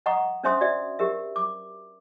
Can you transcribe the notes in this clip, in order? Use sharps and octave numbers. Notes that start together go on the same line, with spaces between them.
D#5 F#5 A#5 C#6 D#6
C#4 D4 C5 E5 C6 D#6
F#4 D5 E5
G4 A#4 E5
D6